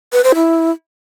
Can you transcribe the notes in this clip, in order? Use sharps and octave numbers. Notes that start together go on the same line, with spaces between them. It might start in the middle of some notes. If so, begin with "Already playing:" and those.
B4
C5
E4